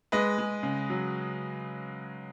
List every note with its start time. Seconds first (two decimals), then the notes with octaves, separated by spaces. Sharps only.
0.12 G#3 B4 D#5
0.38 G#3
0.63 C#3
0.90 F#3